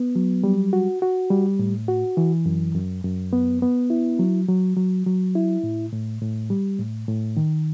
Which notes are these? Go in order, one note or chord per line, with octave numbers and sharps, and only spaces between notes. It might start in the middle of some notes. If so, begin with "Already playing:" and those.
Already playing: B3
F#3
G3
F#4
F#4
G3
A2
F#4
E3
F#2
F#2
F#2
B3
B3
E4
F#3
F#3
F#3
F#3
E4
A2
A2
A2
G3
A2
A2
D#3